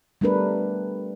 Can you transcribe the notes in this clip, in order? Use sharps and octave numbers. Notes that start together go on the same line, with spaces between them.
G3 A3 B3 D4 A#4 B4